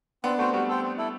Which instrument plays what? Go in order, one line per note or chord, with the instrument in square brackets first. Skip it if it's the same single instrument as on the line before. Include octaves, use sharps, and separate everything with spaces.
[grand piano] B3 D4 [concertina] C4
[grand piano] A3 C4 [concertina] F#4 C5
[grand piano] G3 B3 [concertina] F#4
[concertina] A4 C5 G5
C4
E4 A4